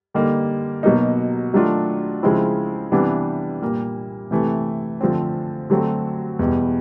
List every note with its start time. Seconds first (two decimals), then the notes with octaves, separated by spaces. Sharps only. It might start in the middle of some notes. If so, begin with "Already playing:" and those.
0.14 D3 G3 A#3 D#4
0.83 B2 F#3 A#3 D#4
1.53 D#3 F#3 A3 D4 F4
2.23 C#3 F3 G#3 C4 E4
2.92 C3 E3 G3 B3 D4
3.62 A#2 G3 A#3
4.31 C3 E3 A3
5.01 D3 F3 A3 C4
5.70 D3 F#3 A3 C4
6.39 E2 B2 G3